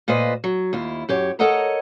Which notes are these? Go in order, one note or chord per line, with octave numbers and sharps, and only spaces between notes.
A#2 F4 B4 C5 D#5
F#3
D#2 E4 F4
F#2 G4 C#5
A4 A#4 C#5 D#5 F#5 A#5